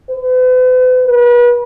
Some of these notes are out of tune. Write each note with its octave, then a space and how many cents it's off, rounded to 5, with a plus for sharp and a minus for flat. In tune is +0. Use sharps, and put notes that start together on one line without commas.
B4 +45
B4 -35